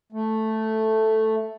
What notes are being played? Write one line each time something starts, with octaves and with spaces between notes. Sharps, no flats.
A3